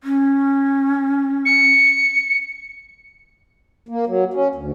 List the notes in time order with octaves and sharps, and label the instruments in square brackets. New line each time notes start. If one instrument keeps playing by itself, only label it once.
[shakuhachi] C#4
[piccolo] C#7
[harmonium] A#3
F#3
C#4
D2